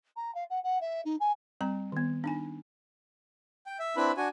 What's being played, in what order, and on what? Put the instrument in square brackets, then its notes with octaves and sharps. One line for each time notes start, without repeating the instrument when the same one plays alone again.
[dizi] A#5
F5
F#5
F#5
E5
D#4
G#5
[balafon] G3 C4 A#5
D#3 B3
D4 D#4 G#5
[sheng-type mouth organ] G5
E5
C4 D4 E4 B4 B5
D4 F#4 G#5